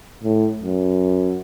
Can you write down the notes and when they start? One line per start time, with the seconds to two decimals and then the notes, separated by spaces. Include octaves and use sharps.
0.24 A2
0.61 F#2